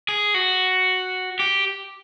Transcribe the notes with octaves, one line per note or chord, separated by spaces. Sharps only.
G#4
F#4
G4